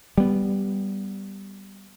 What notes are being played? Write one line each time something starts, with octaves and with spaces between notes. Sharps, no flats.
G3 B3